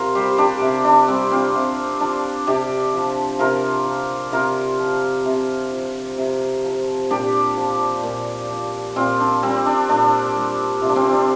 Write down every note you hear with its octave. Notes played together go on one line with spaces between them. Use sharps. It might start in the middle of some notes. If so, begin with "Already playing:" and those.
Already playing: C3 F4 A#4
G3 G4 C5
D4 G4
C3
D4
G3 C4
C4 F4
C3
F3 D4
C3 D4 G4
F3
C3 F4 A#4
F3
C3 F4 A#4
F3
C3
F3
C3
F3
A#2 D4 G4
F3
A#2
F3
A#2 C4 F4
D4
G3 C4
D4
A#2 D4
G3
C3 F4
D4
C4 F4
D4